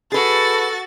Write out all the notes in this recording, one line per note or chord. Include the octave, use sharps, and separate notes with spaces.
F#4 G#4 A4 B4 A6